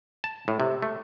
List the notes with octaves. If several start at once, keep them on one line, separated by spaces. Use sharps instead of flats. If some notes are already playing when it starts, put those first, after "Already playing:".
A5
A2
C3
A3